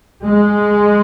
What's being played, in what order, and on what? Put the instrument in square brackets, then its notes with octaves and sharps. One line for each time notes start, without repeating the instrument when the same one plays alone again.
[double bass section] G#3